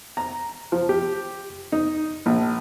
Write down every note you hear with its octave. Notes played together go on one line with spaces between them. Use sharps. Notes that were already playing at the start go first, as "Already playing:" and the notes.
A#5
F3
G4
D#4
A#1